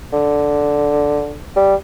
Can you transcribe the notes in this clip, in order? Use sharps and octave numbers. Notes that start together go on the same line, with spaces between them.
D3
G3